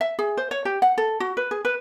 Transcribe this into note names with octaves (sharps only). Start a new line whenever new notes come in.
E5
G#4
C5
C#5
G4
F#5
A4
F#4
B4
G#4
B4